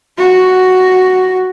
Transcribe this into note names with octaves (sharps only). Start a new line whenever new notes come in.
F#4